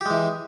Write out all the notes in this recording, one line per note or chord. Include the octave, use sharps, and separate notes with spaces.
E3 G#3 G4